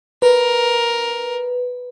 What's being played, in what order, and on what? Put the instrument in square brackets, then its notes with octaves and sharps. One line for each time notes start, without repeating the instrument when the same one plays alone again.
[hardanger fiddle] A#4 [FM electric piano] B4